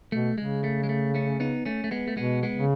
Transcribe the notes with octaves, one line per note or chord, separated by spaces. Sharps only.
B2 A3
C#3 G#3
A3
G#3
A3
A3 C#4
B3 D#4
A3 C#4
A3
G#3 B3
A3
B2 G#3 B3
G#3 B3
C#3